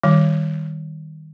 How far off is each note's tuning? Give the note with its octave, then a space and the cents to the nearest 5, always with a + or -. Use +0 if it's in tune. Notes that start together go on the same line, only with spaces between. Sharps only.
D#3 +0 G3 +0